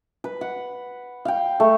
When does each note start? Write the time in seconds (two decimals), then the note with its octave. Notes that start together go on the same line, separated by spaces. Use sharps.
0.24 B4
0.41 F#5
1.25 F5 G5
1.60 A3